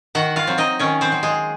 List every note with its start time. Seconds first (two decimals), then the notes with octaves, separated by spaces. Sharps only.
0.15 D#3 F#4 F#5
0.36 F4 F5
0.47 F#3 C4
0.58 D#4 D#5
0.79 D#3 C#4 C#5
1.01 C4 C5
1.12 F#3 C4
1.23 G#3 G#4